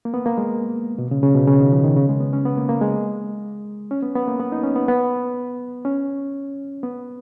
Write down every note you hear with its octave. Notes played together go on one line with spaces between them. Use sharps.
A#3
B3
A#3
G#3
B2
C#3
C#3
B2
C#3
D#3
F3
D#3
C#3
G#3
B3
C#4
B3
A#3
A#3
G#3
C#4
B3
B3
A#3
B3
D#4
C#4
B3
B3
C#4
B3